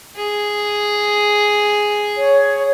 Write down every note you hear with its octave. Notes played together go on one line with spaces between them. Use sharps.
G#4
C#5